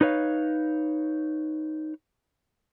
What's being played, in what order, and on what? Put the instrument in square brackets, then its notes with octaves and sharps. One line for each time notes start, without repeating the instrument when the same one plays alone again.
[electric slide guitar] D#4 B4 C#5 F5